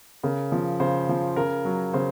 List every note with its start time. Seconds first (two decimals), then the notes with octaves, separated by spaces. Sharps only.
0.23 C#3 A#4
0.52 F3
0.80 C#3 C5
1.09 F3
1.36 C#3 A#4
1.65 F#3
1.93 C#3 C5